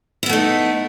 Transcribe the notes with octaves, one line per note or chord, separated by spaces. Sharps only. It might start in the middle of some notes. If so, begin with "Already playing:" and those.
A3 B3 D#4 E4